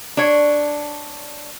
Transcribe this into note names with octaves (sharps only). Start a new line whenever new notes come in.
D4 C#5